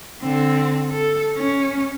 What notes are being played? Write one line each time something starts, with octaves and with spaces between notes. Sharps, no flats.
D3 C4
A4
C#4